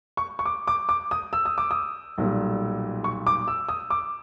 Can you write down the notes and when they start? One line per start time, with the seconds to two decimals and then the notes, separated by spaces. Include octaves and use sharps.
0.17 C#6
0.39 C#6
0.45 D6
0.67 D6
0.89 D6
1.11 D#6
1.33 E6
1.45 D#6
1.58 D6
1.71 D#6
2.18 B1 A#2 G3
3.04 C#6
3.27 D6
3.48 E6
3.69 D#6
3.90 D6